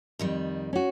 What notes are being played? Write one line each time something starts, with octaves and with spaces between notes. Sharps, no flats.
F2 D#3 G3
C#4 F#4